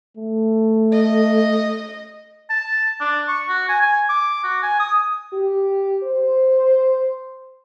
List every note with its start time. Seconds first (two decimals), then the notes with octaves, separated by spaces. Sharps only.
0.17 A3
0.92 D#5
2.50 A5
3.00 D4
3.28 C#6
3.49 F#4
3.69 G#5
3.82 G#5
4.09 D6
4.44 F#4
4.63 G#5
4.80 D#6
5.33 G4
6.03 C5